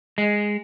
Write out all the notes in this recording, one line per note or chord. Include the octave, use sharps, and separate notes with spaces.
G#3